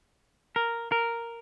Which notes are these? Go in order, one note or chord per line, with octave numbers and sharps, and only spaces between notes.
A#4
A#4